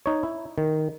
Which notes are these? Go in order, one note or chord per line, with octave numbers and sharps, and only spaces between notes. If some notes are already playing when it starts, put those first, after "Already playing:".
D#4 C#5
E4
D#3